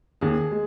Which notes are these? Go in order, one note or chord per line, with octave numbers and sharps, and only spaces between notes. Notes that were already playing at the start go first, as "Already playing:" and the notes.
D#2 G#4
G#3